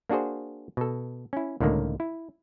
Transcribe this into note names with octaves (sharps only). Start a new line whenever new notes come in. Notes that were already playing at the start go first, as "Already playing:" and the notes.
A#3 D4 F#4 G#4 C5
B2 A4
C#4 E4
C#2 A2 D3 D#3 A#3
E4